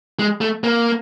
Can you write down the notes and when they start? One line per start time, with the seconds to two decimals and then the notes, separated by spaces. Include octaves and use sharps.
0.19 G#3
0.41 A3
0.64 A#3